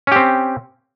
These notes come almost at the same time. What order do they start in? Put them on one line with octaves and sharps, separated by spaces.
C#4 G4 C4